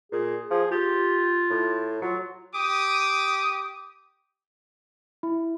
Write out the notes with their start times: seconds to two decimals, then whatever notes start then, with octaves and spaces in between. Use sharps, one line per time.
0.12 A#2 G#4
0.50 F3 G#4
0.71 F4 G4
1.50 A2
2.02 F#3 F4
2.54 G4 D6 D#6
5.23 E4